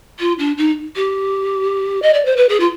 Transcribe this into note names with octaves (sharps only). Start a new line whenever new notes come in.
F4
D4
D#4
G4
D#5
D5
C5
B4
G#4
F4